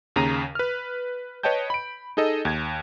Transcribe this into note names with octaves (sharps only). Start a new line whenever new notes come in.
D#2 C#3 A#5 A#6 D#7
B4 F6
B4 C#5 D#5 G5 A5 G6
B5 D7
D#4 G#4 A4 D#5
D#2 G#6